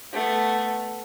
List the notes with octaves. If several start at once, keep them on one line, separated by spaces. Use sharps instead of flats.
A3 B3